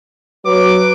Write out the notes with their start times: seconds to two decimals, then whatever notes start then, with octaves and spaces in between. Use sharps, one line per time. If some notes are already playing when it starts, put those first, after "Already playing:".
0.45 F#3 B4 D6